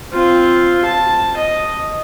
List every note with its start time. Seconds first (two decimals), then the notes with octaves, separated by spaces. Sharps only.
0.12 C4 F4
0.85 A5
1.37 D#5